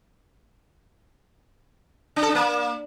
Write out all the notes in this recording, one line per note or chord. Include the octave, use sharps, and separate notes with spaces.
D4
A4
D4
A#3